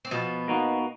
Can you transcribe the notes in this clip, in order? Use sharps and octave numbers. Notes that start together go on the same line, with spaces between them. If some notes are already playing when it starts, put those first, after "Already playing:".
C4
B2 F3 B3
A#3 D#4 F#4